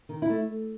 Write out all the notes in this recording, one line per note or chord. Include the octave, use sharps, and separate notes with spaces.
D#3
E4
A3